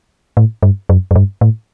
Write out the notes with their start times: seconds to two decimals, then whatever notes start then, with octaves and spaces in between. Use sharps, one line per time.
0.37 A2
0.63 G2
0.89 F#2
1.11 F#2
1.16 G2
1.41 A2